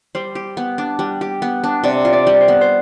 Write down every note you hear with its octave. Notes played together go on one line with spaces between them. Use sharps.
G3 C5
G4
B3
D4
G3
G4
B3
D4
C3 D5
F4
D5
G3
C5
B3
C5